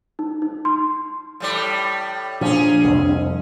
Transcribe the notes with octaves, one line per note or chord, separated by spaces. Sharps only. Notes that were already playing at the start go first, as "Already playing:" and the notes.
D#4
D#4
C6
A2 G3 D5
A#2 F3 C#4 D4 G#4
C2 F2